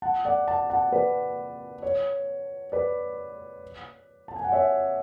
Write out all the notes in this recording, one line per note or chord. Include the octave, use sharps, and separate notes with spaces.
F#5 A5
D5 F#5
F#5 A5
F#5 A5
B4 D5
C#5
B4 D5
A5
G#5
F#5
C#5 E5